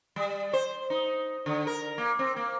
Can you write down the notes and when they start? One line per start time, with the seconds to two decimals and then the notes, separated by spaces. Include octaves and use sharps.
0.16 G3
0.53 C5
0.90 D#4
1.46 D3
1.67 A#4
1.98 A#3
2.19 C4
2.36 A#3